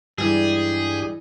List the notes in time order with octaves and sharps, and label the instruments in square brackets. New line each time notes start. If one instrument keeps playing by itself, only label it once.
[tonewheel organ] G2 G4 [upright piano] E3 [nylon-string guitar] G3 G#3 D4 [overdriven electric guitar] G#4